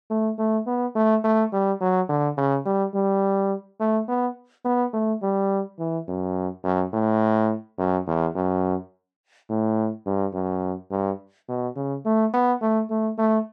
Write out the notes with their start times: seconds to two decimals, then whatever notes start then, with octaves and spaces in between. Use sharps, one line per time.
0.10 A3
0.38 A3
0.67 B3
0.95 A3
1.24 A3
1.52 G3
1.81 F#3
2.09 D3
2.38 C#3
2.65 G3
2.94 G3
3.80 A3
4.08 B3
4.65 B3
4.94 A3
5.22 G3
5.79 E3
6.08 F#2
6.64 F#2
6.93 A2
7.78 F#2
8.07 E2
8.35 F#2
9.49 A2
10.06 G2
10.34 F#2
10.91 G2
11.48 B2
11.76 C#3
12.05 A3
12.33 B3
12.61 A3
12.90 A3
13.18 A3